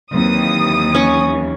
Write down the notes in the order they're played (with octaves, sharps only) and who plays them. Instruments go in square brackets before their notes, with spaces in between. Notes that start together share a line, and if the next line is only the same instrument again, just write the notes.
[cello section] D#2 E3 [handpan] F#3 A#3 C4 [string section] D#6
[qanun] C#4 C#6